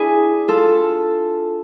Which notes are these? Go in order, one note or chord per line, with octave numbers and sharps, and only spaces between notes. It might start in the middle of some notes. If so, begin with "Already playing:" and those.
Already playing: D4 E4 G#4
F4 A4